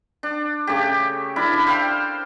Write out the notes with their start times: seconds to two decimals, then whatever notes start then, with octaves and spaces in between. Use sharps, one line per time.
0.23 D4
0.67 C#3 A3 G4
1.36 D4 E4 A#4 B5
1.67 C5 F5 G5